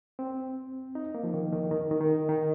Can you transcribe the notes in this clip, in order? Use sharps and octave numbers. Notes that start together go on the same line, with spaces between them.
C4
D#4
A#3
F3
D#3
D#3
D#3
D#3
D#3
D#3